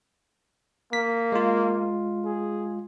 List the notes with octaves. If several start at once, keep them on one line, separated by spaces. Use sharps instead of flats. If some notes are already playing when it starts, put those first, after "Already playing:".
A#3 B6
G#3 F4
G#4